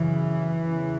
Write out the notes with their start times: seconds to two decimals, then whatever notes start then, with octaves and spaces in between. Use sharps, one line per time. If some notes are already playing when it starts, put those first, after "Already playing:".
Already playing: F#2 C#3 E3
0.63 E2 C#3